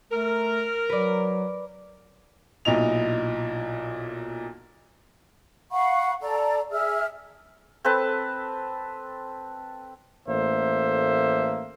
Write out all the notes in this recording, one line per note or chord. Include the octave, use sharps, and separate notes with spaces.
A3 A#4
F#3 B4 D5
B1 A#2 D#4 E4 D#5 F7
F5 F#5 B5 C#6
A4 D5 A#5
G#4 E5 E6 F6
C4 A4 B4 A5
A1 A3 A#3 C5 E5